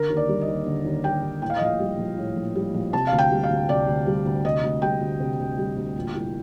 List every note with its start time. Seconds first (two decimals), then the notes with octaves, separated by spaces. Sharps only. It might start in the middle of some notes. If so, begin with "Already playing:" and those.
Already playing: D3 A#4
0.09 D#2
0.17 D5
0.29 G3
0.41 D#5
0.48 D#2
0.66 D3
0.85 D#2
1.04 G3 G5
1.23 D#2
1.42 A2 G5
1.50 F5
1.57 D#5
1.61 A#1 F5
1.80 G3
1.99 A#1
2.18 A2
2.36 A#1
2.55 G3
2.74 A#1
2.93 C3 A5
3.07 F5
3.12 D2
3.18 G5
3.31 G3
3.43 F5
3.50 D2
3.69 C3 D5
3.87 D2
4.07 G3
4.25 D2
4.44 C3 D#5
4.63 D2
4.82 G3 G5
5.01 D2
5.20 C3
5.39 D2
5.58 G3
5.76 D2
5.96 A#2
6.14 C2